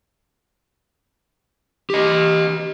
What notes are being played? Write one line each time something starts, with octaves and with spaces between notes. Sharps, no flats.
G4 D#5